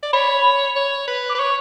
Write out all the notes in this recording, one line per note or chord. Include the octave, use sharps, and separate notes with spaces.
D5
C#5 B5
C#5
B4
D6
B4
C#5 C#6